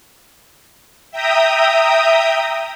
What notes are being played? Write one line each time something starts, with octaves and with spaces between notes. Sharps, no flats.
E5 G5 A#5 D#6